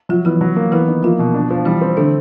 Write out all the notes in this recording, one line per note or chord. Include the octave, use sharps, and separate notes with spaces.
F3 F#3 F4
E3 B3 E4
F#3
A#3
E3 B3 E4
D#3
F3 A#3 F4
B2
D4
F3
E3 G3 E4
C4
D3 A3 D4